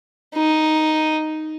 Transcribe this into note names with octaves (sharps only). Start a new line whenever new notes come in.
D#4